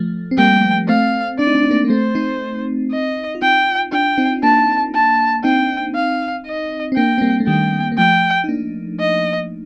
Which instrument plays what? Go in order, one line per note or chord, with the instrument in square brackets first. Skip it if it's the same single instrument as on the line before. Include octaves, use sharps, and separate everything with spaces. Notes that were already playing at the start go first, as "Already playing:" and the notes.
Already playing: [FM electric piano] F3 A3
C4
[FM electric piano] G3 A#3 [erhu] G5
[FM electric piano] A3 C4 [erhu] F5
[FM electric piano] D4 [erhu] D5
[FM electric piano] D#4
D4
D#4
A#3 D4
A#3
[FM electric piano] A3 C4 [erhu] C5
[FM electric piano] C4 D#4
[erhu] D#5
[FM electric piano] F4
[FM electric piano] C4 D#4 [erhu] G5
[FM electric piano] D4 F4 [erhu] G5
[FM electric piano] C4 D#4
[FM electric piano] A#3 D4 [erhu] A5
[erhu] A5
[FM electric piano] C4 D#4 [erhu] G5
[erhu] F5
D#5
[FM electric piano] C4
[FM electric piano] A#3 D4 [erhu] G5
[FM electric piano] C4
G3 A#3
A3
[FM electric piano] D#3 G3 [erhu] G5
[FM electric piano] A#3
[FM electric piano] F3 A3 [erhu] G5
[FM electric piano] D#4
A#3 D4
[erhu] D#5